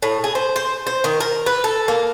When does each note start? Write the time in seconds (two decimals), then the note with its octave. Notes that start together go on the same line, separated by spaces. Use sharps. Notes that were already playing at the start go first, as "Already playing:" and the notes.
0.03 A2
0.24 G#4
0.35 C5
0.56 C5
0.87 C5
1.04 D#3
1.20 A#4
1.46 B4
1.64 A4
1.88 A#3